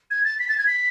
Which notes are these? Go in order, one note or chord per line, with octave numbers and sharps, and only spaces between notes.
G#6
A6
B6
A6
G#6
B6